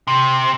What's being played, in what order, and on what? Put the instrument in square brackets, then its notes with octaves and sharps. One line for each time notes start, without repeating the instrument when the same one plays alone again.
[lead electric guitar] C3